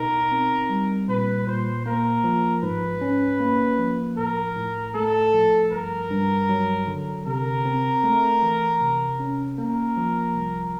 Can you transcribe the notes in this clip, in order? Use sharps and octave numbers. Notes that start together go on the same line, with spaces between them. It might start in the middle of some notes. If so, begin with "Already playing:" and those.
Already playing: B2 D#4 A#4
C4
G3
A#2 B4
A#2 C5
A#3 A#4
F3
G#2 B4
C#4
A#3
F3
A2 A#4
A2
A3 A4
F3
G2 A#4
G2
F#3
D3
C3 A#4
C4
A3
E3
C3
C#4
A#3 A#4
F3
C2